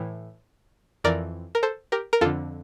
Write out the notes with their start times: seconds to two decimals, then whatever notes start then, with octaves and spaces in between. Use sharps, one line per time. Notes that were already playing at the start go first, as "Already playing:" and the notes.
Already playing: A2 E3
1.04 F2 E3 A#4 D5
1.55 A#4
1.63 A4 C5
1.92 G4 A#4
2.13 A#4
2.21 F2 D3 F4 A4